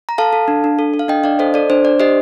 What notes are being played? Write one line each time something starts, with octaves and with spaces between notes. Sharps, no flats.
A#5
A4 F5 A5
A4
D4
D4
A4
A4
F5
D4 D#5 G5
D4 D5 F5
A4 C5 D#5
A4 D5
D4 C5
D4 D5
G4 C5 D#5